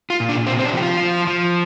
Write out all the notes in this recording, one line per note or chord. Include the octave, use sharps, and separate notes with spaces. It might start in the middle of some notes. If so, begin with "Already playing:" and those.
F4
A#2
D4
C3 C4
C4
D4
F3 G4
F4
F3
F3